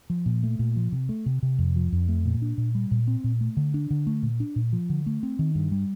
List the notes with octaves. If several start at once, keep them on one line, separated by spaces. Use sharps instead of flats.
F3
A#2
A3
A#2
F3
C3
A3
C3
C3
F2
F3
F2
A3
A#2
D4
A#2
G3
A#2
C4
A#2
A3
D3
D4
D3
A3
A#2
D4
A#2
F3
D3
A3
C4
D#3
G2
G3